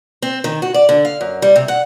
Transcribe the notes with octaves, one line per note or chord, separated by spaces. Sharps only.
C4
D#3
F#4
D5
D3
F5
F#2
G3
C3
F#5